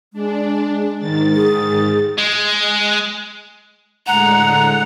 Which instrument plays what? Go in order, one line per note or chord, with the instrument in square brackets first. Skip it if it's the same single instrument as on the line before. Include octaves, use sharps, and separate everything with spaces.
[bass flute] G#3 [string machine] D4
[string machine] G#2 D#3 A6
[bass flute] G#4
[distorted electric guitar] G#3
[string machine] A2 D3 G#3 [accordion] F#5 [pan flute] A#5